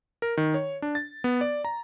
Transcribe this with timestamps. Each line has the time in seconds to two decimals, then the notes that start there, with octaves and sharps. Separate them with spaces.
0.22 A#4
0.37 D#3
0.54 C#5
0.82 D4
0.95 A6
1.24 B3
1.41 D5
1.65 A#5